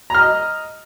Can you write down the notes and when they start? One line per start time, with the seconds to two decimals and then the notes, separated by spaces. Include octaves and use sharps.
0.10 A#5
0.15 F6
0.19 D#5